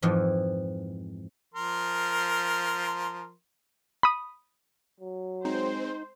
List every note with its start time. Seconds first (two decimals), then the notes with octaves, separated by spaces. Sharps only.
0.02 F2 G#2 E3 F3
1.54 F3 A#4 C6
4.03 B5 D#6
5.00 F#3
5.45 G#3 C4 D#4 C5